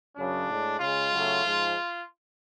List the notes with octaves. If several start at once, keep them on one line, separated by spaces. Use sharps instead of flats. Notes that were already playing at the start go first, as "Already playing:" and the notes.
F#2 C#3 F#3 D4
A2 G#3
C#3 G#3 F4
C#3 F#3 A3
G#2 F3 G#3